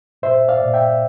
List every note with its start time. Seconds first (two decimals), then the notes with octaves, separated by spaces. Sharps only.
0.22 A#2 C5 E5
0.48 D5 F5
0.62 A#2
0.74 E5 G5